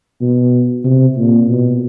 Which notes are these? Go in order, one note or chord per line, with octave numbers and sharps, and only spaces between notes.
B2
C3
A#2
B2